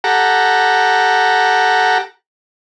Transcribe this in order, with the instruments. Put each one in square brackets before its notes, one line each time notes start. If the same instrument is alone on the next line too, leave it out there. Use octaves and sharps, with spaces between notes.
[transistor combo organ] G4 A4 F#5 A#5